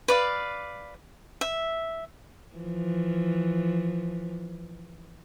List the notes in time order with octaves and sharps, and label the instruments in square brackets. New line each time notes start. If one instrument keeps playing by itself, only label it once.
[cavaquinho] B4 D5 F5
E5
[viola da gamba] E3 F3